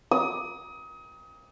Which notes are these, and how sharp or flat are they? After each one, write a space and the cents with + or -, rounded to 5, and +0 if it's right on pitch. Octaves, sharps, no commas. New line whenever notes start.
D#6 +30